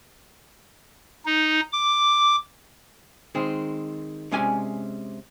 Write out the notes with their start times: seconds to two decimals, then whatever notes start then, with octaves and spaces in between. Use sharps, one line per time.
1.26 D#4
1.73 D6
3.35 D#3 G#3 C4
4.32 C3 G#3 C#4 D5 G#5